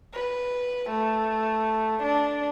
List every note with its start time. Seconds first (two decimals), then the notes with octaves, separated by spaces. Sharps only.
0.14 B4
0.90 A3
2.03 D4